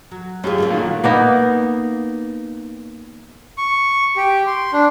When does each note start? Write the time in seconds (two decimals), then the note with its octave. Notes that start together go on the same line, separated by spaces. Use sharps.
0.11 F#3
0.44 F#2 D#4 F4 G4 G#4
0.58 G3 A3 A#3
0.70 A#2 D#3 F#4
1.04 A#3 B3 D#4
3.58 C#6
4.17 G4
4.47 C6
4.73 D4